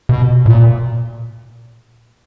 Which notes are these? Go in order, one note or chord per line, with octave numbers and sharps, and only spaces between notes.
B2
A2
A#2